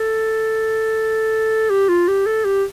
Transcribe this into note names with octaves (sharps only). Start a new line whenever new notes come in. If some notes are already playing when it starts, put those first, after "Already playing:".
Already playing: A4
G4
F4
G4
A4
G4